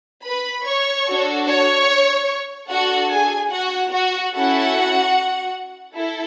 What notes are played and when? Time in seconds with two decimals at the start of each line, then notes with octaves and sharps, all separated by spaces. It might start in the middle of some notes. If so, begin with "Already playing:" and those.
0.25 B4 B5
0.66 C#5 C#6
1.07 D4 F#4 A4
1.47 C#5 C#6
2.70 D4 F#4 A4 F#5
3.11 G#4 G#5
3.51 F#4 F#5
3.92 F#4 F#5
4.33 C#4 E4 F#4 A4 F#5
5.96 E4 A4